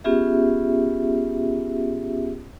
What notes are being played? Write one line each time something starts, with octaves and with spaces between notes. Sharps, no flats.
B3 C#4 F4 G4 G#4 E5